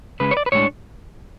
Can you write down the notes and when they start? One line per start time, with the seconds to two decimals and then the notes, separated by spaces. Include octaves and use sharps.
0.20 C#2 C#3 G#3 B4
0.31 C#5
0.37 D5
0.46 B4
0.52 A2 G#3 D4 C#5